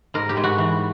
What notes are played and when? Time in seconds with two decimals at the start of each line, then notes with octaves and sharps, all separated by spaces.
0.14 G#2 A#4
0.29 G4
0.37 G#2
0.44 F#4
0.58 E3